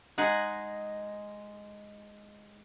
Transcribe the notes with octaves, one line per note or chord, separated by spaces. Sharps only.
G#3 D#4 G#4 F#5